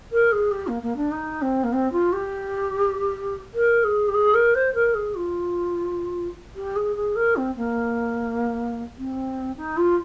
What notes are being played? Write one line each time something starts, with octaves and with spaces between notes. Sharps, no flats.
A#4
G#4
G4
A#3
A#3
D4
D#4
C4
A#3
C4
F4
G4
A#4
G#4
G4
G#4
A#4
C5
A#4
G#4
F4
G4
G#4
G#4
A#4
C4
A#3
C4
D#4
F4